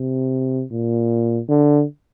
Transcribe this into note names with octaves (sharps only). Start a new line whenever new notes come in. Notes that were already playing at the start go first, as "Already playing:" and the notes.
Already playing: C3
A#2
D3